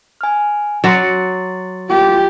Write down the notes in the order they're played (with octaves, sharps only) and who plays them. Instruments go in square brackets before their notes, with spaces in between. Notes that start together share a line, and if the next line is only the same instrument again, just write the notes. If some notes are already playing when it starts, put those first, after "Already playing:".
[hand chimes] G#5 F6
[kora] F#3 F#4 [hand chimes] C6 D6 A6
[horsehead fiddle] F4 G4